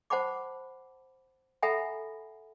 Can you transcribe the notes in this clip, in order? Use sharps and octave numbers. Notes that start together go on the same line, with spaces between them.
C5 F#5 A5 B5 D6
A4 E5 F#5 G#5 A#5 B5